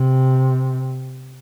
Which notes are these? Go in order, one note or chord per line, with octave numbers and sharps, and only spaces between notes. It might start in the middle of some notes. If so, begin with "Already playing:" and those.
Already playing: C3